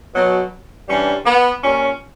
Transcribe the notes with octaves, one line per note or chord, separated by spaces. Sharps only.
B2 F#3
G2 E3 G3 C#4
B3
A#2 G3 C#4